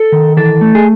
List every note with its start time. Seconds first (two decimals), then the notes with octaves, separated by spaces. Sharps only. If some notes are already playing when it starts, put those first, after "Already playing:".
Already playing: A4
0.12 D#3
0.37 E3 A4
0.61 A3
0.75 G#4